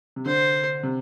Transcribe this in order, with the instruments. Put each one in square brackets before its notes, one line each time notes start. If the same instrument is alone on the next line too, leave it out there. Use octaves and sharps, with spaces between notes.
[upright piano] C3
[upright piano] D3 [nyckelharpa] C5
[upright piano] C3